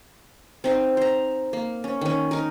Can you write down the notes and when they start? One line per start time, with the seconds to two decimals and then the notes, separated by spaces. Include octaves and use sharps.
0.64 C4 D#4 C5
0.97 C5 A#5
1.53 A#3
1.84 C#4
2.01 D#3 C#4
2.31 D#4 A#4